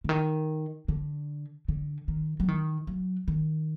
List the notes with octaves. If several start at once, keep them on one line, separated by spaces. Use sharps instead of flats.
D3
D#3
D3
D3
D#3
F#3
D#3
F#3
D#3